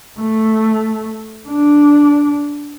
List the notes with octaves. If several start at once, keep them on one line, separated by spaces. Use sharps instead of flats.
A3
D4